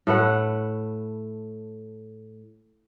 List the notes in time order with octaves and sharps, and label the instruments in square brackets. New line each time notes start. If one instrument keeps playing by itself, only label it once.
[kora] A2 A3 B4 F#5